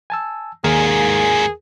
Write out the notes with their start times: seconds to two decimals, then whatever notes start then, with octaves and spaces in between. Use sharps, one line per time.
0.10 G#5 A5 E6
0.64 D#2 G#2 A#3 G#4 A#4